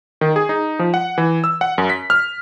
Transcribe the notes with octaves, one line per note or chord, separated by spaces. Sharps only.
D#3
G#4
D#4
F3
F#5
E3
E6
F#5
F#2
B6
F6